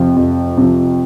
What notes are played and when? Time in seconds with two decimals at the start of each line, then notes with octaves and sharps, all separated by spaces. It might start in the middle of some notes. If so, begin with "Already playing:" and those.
Already playing: F2 C3 F3
0.16 F2
0.57 C3 F3